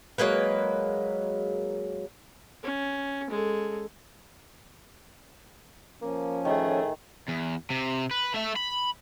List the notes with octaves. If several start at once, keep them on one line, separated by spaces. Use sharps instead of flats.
F#3 G#3 A#3 B4
C#4
G#3 A4
F3 A#3 C#4
A2 D#3 A3 G#4
E2
C3
B4
A3 E5
B5